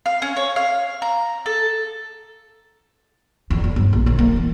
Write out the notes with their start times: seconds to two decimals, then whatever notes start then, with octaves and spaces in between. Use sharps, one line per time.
0.06 F5
0.22 C#4
0.36 C#5
0.56 F5
1.02 A#5
1.46 A4
3.50 E2
3.64 F2
3.76 G1
3.93 A#1
4.06 D#3
4.19 A#3
4.36 E3